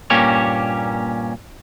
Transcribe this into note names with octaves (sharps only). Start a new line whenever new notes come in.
G2 A#2 A#3 C#4 G4 C#5